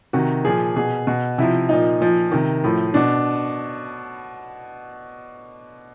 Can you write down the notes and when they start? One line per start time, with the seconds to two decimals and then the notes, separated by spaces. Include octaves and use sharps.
0.13 C3 D#3 F#4
0.45 A#2 F3 G#4
0.76 B2 G#4
1.07 B2
1.38 C3 F3 E4
1.69 A#2 F3 D#4
2.01 A#2 F3
2.31 C3 D#3
2.64 A2 F3
2.94 B2 D4